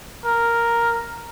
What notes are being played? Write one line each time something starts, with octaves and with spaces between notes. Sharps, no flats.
A#4